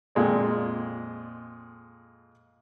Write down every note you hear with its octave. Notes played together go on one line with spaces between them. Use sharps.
F2 A#2 G#3 D5